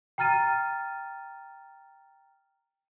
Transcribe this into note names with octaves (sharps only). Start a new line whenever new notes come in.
G5 A#5 F6 A6 D#7